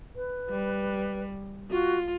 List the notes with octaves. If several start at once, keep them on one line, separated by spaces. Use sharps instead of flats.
B4
G3
F4 F#4